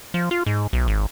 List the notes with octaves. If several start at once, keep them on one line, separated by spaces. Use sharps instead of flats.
F3
F4
G#2
B1
G#1